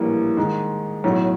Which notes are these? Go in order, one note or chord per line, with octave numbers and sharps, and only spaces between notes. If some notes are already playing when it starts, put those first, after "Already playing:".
Already playing: A#1 A2 E3 G3 A#3
G#2 D#3 G#3
B1 A2 F#3